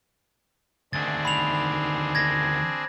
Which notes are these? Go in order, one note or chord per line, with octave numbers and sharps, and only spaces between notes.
D2 D#3 C4 D4 G#4 A6
B5 F7
G#6 A#6